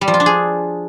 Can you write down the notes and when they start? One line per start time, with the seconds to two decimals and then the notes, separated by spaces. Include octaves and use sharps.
0.01 G3
0.08 F3
0.14 F4
0.20 D4
0.26 G#4